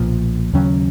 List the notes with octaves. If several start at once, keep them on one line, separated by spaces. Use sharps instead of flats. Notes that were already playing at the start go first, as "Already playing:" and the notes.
Already playing: B1 A#2 F3
D#2 C#3 F#3 C#4